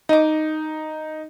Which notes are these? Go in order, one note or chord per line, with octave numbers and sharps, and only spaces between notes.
D#4 D#5 D6